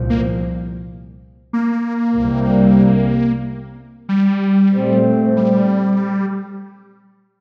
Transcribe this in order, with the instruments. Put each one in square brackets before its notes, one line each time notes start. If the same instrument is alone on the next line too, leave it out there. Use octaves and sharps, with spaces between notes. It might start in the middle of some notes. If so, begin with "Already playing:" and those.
Already playing: [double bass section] C2 A#2 F3
[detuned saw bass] A#3
A#3
[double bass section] C2 C3 G3
[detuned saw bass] G3
[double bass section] A#2 A3 C4
[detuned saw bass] G3